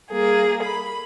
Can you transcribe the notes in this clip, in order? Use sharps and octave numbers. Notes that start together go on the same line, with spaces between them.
G3 A#3 G#4
B5